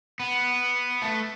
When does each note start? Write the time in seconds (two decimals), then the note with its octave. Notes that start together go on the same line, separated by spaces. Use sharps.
0.20 B3
1.02 A3